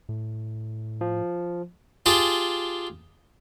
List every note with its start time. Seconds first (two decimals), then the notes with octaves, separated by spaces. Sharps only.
0.09 A2
1.01 F3
2.06 F4 G4 G#4 A5